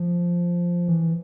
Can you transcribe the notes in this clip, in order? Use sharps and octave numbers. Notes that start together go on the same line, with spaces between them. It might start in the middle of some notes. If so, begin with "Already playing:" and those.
Already playing: F3
E3